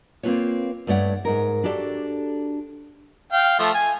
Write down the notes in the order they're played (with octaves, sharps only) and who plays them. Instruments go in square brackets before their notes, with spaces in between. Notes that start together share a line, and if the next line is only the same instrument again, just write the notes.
[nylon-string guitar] A#3 C4 D#4 F4 B4 C#5
G2 A3 C#5 D5 F#5
G#2 D#4 A#4
D4 F#4 G4 A4 D5
[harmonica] F5 G5
F3 A3
G#5